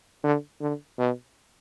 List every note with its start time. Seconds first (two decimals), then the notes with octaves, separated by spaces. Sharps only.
0.23 D3
0.61 D3
0.98 B2